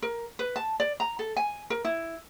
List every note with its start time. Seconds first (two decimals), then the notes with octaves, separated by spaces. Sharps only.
0.02 A#4
0.39 B4
0.56 A5
0.80 D5
1.00 A#5
1.19 A4
1.37 G#5
1.70 A#4
1.85 E4